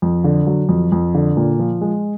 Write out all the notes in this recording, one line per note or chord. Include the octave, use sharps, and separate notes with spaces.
F2
D3
F#3
F2
F2
D3
A#2
F3
G#3